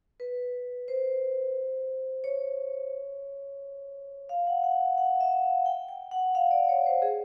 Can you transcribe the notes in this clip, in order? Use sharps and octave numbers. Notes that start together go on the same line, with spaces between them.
B4
C5
C#5
F5
F#5
F#5
F#5
E5
F5
G5
G5
F#5
F5
D5
C#5
C5
G#4